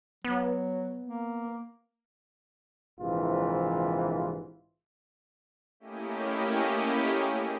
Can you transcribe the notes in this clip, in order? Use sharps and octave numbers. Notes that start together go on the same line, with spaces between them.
F#3 B3
A#3
A#1 G#2 C3 E3 F4
A3 A#3 C#4 E4 G4 D#5
G#4